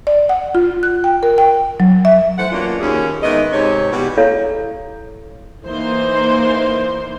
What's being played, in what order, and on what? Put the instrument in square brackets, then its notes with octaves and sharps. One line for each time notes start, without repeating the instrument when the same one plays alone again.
[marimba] D5
F#5
F4
F#6
G5
A#4
G5
F#3
E5
[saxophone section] E3 A3 C5 F#5
F#3 A#3 B3 C#4 D4 F4
D#2 C#4 G#4
G#2 D#3 E3 B3 D#5
G#2 C3 C4 C#5
B2 E3 G3 D#4 F#4
[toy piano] E4 A4 C#5 F5
[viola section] E3 A#3 D#4 C5 C6